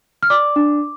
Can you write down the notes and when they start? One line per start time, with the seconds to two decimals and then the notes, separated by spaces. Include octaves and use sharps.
0.23 F6
0.30 D5 D6
0.56 D4